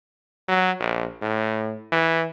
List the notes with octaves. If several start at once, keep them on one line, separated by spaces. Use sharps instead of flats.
F#3
A#1
A2
E3